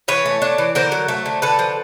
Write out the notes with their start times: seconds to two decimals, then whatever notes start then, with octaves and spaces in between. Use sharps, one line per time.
0.08 E3 B4 C#5
0.26 A3
0.42 D4
0.58 E3
0.75 D3 A#4 C5
0.92 F#3
1.08 A3
1.26 D3
1.42 D3 A4 B4
1.59 F3